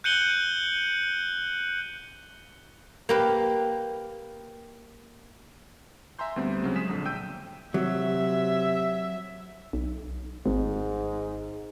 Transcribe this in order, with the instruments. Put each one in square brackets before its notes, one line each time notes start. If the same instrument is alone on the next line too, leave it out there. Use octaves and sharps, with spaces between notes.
[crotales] F#6 G6 C#7 D#7 F#7 G7
[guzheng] A#3 G4 B4
[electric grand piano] E5 G#5 A#5 C6 G6
D2 G3 B3 C4
C#3 F#3 C4
F#3 G#3 G#4 B6 E7
A#1 D3
G5 E6 G6 D#7
[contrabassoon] C3 [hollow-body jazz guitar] F#3 [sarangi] E5
[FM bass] B1
[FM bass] G#1 [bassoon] G#2